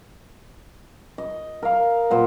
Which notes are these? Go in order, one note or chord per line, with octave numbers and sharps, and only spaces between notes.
D#5
A#4 F5
A#2 C5 F#5